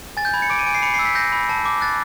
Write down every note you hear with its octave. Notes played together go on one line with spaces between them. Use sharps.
G#5 A6
G6
B5 G#6
C#7
D6 D7
D#7
G#5 D7
C7
B5 C#7
C7
E6
B6
G6 A#6
B5
A5
D6
F#6 A6